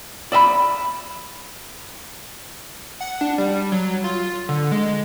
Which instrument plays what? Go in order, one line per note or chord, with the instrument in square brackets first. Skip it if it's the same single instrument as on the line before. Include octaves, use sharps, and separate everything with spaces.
[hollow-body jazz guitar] D5 E5 F5 B5
[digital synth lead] F#5
D4
G3
F#3
F4
D3
G#3